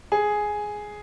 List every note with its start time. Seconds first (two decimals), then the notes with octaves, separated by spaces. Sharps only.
0.12 G#4